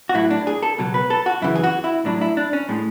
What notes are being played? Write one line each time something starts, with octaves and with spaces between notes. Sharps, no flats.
F#4
A2 F#3 E4
D4
G#4
A4
C#2 B2 F#3
B4
A4
F#4
F#2 C#3 E3 E4
G#4
F#4
E4
A2 F#3 D4
E4
D4
C#4
A2 G#3